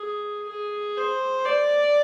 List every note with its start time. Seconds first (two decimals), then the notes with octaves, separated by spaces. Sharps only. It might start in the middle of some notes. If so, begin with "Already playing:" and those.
Already playing: G#4
0.49 G#4
0.97 C5
1.45 D5